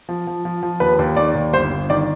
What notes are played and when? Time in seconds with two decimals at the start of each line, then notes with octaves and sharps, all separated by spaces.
0.09 F3
0.27 F3
0.45 F3
0.63 F3
0.80 D#2 B4
0.99 D#2
1.16 D#3 D5
1.35 D#2
1.53 G1 C5
1.71 G1
1.90 D#3 D5